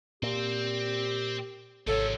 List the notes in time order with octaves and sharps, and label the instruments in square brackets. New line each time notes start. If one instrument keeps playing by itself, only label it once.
[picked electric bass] A#2 [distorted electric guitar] C4 C5 [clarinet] G4
[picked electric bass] G#1 [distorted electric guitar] C3 F3 [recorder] A4 [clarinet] C#5